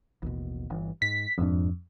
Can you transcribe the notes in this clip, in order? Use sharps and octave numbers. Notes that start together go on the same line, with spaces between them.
A1 D#2 B2
G1 G2 E3
G#2 B6
D#1 F2 G#2 D4